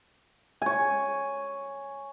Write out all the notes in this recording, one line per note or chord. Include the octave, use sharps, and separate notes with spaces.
C#5 G#5